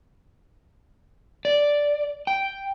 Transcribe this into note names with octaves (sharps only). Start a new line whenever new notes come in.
D5
G5